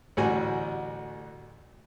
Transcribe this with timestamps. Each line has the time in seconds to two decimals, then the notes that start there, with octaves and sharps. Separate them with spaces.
0.17 A1 D2 G3 F#4 G#5